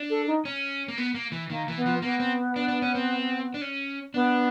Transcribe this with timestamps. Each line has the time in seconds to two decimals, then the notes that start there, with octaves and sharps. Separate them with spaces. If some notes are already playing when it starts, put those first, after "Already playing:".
Already playing: D4
0.10 A4
0.27 D#4
0.45 C#4
0.88 A#3
0.98 B3
1.14 A#3
1.32 E3
1.50 D#3 A#3
1.68 E3
1.76 B3
1.86 F3
2.02 A#3 B3
2.20 C4
2.56 D4
2.68 D4
2.82 C#4
2.95 C4
3.54 D4
3.61 C#4
4.14 B3 D4